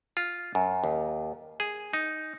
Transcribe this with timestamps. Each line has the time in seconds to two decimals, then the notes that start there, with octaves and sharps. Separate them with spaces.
0.17 F4
0.55 F#2
0.84 D#2
1.60 G#4
1.93 D#4